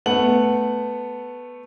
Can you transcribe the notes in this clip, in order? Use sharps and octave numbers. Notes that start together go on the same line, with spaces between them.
A3 B3 F#5 F#7